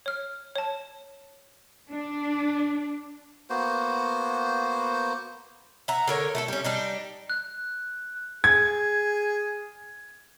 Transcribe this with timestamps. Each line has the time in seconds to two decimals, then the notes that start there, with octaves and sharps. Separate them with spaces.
0.06 C#5 F6
0.56 C#5 A5
1.90 D4
3.50 A#3 B3 F#4 C5
5.88 E5 F#5 A#5
6.07 D3 A#4 C#5
6.35 A3 F#4 A4
6.48 G3 C#4
6.64 G3 D4 D#4
7.30 F#6
8.44 G#4 G#6